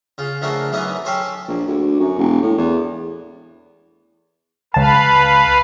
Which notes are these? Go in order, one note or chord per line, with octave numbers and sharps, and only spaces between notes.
C#3 F4
C#3 F3 A3 A#3 D4 F#4
F#2 E3 A3 B3 C#4 D#4
C#4 G4 A4 C5 C#5
A#1
D2
F#2
E1
A2
E2
C#2 B4 F5 A5